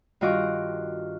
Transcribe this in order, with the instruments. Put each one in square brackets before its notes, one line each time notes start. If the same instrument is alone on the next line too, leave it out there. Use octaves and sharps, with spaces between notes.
[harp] G2 D#3 F4 F#4 D#5 D6